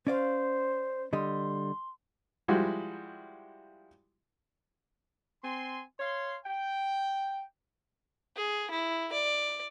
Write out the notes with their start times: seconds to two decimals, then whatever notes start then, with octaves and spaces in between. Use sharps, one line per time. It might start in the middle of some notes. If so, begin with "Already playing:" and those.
0.07 C#4 C5 D5 F5
1.13 D3 G3 D#5 C6
2.48 F3 G3 G#3 E4 F#4
5.44 C4 G#5 C6
6.00 C#5 F5 C6
6.45 G5
8.37 G#4
8.71 E4
9.12 D5